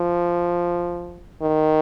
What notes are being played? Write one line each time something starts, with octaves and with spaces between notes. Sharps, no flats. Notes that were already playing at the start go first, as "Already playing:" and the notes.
Already playing: F3
D#3